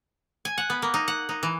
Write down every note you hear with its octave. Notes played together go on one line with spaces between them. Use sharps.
G#5
F#5
B3
A#3
D#4
F#5
D#4
E3